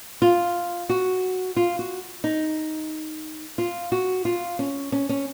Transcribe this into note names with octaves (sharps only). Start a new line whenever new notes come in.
F4
F#4
F4
F#4
D#4
F4
F#4
F4
C#4
C#4
C#4